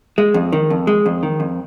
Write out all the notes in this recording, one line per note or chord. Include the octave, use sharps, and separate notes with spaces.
G#3
F2
D#3
F2
G#3
F2
D#3
F2